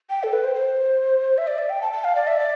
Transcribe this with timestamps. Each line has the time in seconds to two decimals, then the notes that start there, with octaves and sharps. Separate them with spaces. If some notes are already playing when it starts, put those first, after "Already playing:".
0.10 G5
0.23 A4
0.33 B4
0.44 C5
0.55 C5
1.38 E5
1.47 D5
1.58 E5
1.70 G5
1.81 A5
1.92 A5
2.04 F5
2.15 D5
2.27 E5
2.39 D5